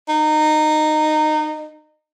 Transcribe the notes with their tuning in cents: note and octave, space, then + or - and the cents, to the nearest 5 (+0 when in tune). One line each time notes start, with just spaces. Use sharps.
D#4 -20